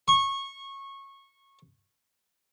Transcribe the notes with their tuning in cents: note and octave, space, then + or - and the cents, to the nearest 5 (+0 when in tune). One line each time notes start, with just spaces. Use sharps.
C#6 -20